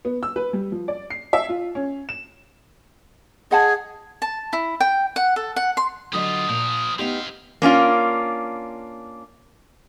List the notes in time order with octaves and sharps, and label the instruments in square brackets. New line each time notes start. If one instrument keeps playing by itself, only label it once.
[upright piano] B3
E6
B4
G3
F3
D5
C7
E5
F4
C#4
E7
[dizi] G#4 [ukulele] D#5 F#5 A5
[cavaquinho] A5
E4
G5
F#5
A4
F#5
C6
[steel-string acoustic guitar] D3 F#3 D#5 [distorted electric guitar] G3 F4 [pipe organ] D#6
[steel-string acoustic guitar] A#2 [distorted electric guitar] F3 A#4
[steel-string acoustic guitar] B3 D#4 G4 [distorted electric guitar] C4 F5
[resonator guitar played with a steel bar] A#3 C#4 D4 F4